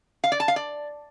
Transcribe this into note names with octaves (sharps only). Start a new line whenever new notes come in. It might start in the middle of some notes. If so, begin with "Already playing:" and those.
F5
D5
A5
F5
D5